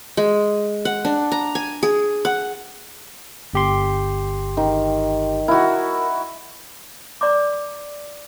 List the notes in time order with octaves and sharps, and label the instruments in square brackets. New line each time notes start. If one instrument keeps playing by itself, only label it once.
[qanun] G#3
F#5
D4
A#5
G#5
G#4
F#5
[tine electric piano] G1 G4 C6
[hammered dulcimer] D#3
[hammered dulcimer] E4 F#4 [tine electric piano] A#4
[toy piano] D5 A#5 C6 D6